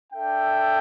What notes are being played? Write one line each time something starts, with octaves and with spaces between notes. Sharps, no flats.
D4 A4 E5 G5